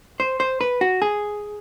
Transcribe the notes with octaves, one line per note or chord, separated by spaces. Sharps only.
C5
C5
B4
F#4
G#4